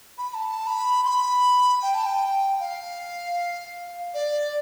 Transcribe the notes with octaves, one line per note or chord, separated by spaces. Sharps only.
B5
B5
A5
B5
C6
B5
G5
A5
G5
F5
D5